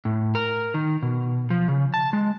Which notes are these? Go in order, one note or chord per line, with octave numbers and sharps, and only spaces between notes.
A2
A#4
D#3
B2
F3
C#3
A5
G#3